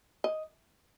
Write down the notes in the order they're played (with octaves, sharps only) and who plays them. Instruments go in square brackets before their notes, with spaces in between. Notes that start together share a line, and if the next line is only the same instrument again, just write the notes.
[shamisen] D#5